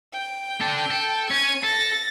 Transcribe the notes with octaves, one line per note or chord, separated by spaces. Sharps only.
G5
D4 A4
A4
C#4 G#6 D#7
A4 A6 A#6